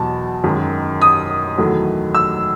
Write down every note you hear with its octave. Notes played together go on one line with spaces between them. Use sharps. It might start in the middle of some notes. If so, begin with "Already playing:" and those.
Already playing: E2 B2 F#3 A5
F#2 D#3 G#3
D#6
E2 D#3 F#3 A3
E6